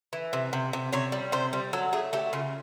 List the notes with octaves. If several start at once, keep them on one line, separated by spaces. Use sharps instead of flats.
E3
C3
C3
C3
C3 C#5
G3
C3 C5
G3
F#3 A4
A3 G#4
A3 G4
C#3 F4